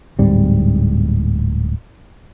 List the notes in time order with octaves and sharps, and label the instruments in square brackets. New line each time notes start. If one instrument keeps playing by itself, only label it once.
[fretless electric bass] D1 G#2 G3 C4